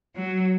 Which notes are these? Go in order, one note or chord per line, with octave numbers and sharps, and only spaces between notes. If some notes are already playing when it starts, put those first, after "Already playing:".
F#3